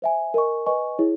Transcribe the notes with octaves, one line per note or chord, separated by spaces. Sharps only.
C5 E5 G#5
A#4 D#5 G#5 C#6
B4 D#5 G#5 C#6
E4 G#4 C#5